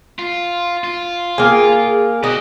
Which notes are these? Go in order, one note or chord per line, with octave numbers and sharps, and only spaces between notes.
F4
F4
A#3 G#4
F#4 G4 D#5